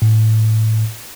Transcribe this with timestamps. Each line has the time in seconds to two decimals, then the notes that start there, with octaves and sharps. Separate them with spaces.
0.02 A2